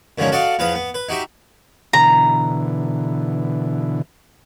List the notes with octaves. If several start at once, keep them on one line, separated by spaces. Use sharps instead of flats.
F#2 D3 D#3 F3 G#3 C#4
F#4 A4 D5 D#5 F5 F#5
E2 F3 B3 B4 F5 D#6
B3
B4
D#4 F#4 G4 E5
B2 D3 E3 A#5